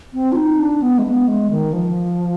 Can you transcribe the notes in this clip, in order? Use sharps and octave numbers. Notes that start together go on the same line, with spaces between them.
C4
F4
D#4
D4
B3
G#3
B3
G#3
D#3
F3